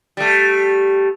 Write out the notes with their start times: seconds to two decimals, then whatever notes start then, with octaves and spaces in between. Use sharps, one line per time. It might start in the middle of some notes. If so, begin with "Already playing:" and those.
0.17 G3 A3